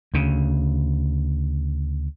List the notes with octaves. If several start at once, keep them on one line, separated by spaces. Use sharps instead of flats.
D2 C#3